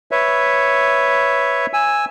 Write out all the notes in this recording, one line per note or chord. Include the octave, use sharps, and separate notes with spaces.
B4 C#5 E5
G#5 E6